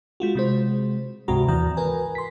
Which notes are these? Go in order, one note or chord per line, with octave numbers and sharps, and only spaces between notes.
G#3 F4 F#4
C3 G#3 C5
C#2 G#2 C3 F#4 A#5
D#2 E3 A#5
A#4 B4 G#5
C6 B6